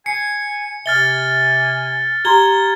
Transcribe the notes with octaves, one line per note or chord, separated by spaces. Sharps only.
G#5 C7 C#7
C3 E5 G#5 F6 A6 G7
G4 A#5 C6 G#6 G7